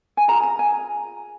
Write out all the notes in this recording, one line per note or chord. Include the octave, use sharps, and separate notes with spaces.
G#5
F4 G#4 A#5
A#5
G#5